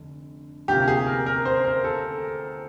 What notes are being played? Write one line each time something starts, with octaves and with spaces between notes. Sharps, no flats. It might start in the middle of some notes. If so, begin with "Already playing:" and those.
Already playing: F1 D3
D2 C3 F3 A#3 G4
G#4
A#4
A#4
C5
A#4
A4